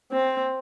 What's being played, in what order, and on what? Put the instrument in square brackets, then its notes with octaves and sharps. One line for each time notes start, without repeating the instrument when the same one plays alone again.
[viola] C4